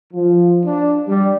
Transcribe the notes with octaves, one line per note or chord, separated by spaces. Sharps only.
F3
D4
G3